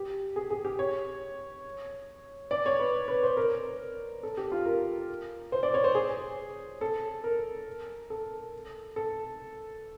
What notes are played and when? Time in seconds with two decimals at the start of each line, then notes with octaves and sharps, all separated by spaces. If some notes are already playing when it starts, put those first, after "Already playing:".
Already playing: G4
0.36 G#4
0.50 G#4
0.65 G4
0.79 C#5
2.51 D5
2.66 C#5
2.79 B4
3.08 B4
3.23 C5
3.37 A#4
4.23 A4
4.37 G4
4.52 F4
4.66 A#4
5.52 C5
5.63 D5
5.74 C#5
5.84 C5
5.95 G#4
6.81 A4
7.24 A#4
8.10 A4
8.96 A4